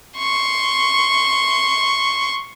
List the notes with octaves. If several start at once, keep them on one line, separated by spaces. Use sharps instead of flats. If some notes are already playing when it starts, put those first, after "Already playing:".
C6 C#6